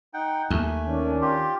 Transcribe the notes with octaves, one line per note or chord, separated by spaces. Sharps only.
D#4 F#5 G5
D#2 A3 G#5
D#3 C#4 D4
F4 G4